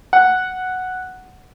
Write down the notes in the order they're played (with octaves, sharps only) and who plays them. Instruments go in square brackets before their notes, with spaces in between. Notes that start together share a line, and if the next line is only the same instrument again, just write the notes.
[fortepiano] F#5